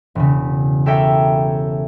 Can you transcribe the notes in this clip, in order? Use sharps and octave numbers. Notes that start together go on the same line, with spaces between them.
E1 C#3
G4 A4 A#4 C#5 E5 G5